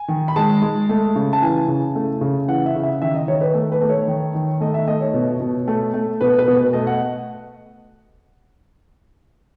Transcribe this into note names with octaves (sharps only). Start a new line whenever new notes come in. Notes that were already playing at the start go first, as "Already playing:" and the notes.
Already playing: G#5
D#3
B5
G#3 A5
G#3
A3
C#3
A5
E3 G#5
C#3
A3
C#3
E3 F#5
E5
C#3
E5
D#3 E5
D#5
D#3 C#5
B4
A3 A4
B4
A3
C#5
D#3
D#3
A3 D#5
E5
A3 D#5
C#5
B2
B2
A3
A3
B2 B4
B4
B2
B4
A3 D#5
F#5